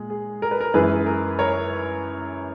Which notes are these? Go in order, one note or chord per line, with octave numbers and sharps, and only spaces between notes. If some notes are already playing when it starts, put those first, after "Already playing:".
Already playing: A#2 G#3
G#4
A#4
B4
A#4
F#2 E3 G#3 G#4 B4
A#4
A#4 C#5